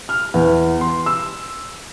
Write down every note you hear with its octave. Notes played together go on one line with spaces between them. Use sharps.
F6
E2
C6
E6